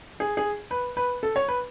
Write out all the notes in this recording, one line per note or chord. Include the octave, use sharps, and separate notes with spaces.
G#4
G#4
B4
B4
A4
C#5
B4